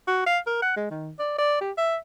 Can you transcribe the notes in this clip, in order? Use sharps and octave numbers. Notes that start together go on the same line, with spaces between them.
F#4
F5
A#4
F#5
G#3
D#3
D5
D5
G4
E5